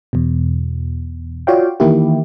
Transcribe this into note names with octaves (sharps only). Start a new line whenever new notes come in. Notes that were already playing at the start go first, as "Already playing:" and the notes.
E2 B2
F4 F#4 C#5 D5 F5 G5
D#3 E3 A#3 E4 G4